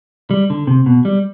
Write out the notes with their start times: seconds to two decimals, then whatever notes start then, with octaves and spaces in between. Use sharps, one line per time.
0.31 G3
0.50 D3
0.67 C3
0.86 B2
1.05 G3